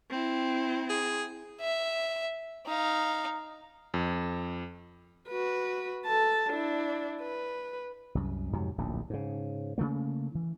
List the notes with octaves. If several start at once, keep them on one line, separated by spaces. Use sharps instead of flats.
C4 E4
G#4
E5
D#4 F5
F2
F#4 B4
A4 A5
D4 E4
B4
C2 F#2
F2 G#2 C3 F#3
D1 A#1 D#2
G#2 C#3
C#3 E3 A3 A#3
E3